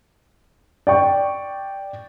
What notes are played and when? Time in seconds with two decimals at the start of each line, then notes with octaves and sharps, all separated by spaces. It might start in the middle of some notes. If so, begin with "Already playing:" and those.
0.87 D5 G5 C#6